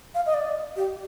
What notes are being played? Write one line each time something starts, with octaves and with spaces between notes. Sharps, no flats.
F5
D#5
D5
G4